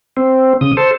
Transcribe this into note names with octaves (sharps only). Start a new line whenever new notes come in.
C4
C#3 D#6
A4 C5